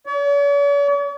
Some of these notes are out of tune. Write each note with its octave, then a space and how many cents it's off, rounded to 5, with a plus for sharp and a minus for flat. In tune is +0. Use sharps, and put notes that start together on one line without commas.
C#5 +45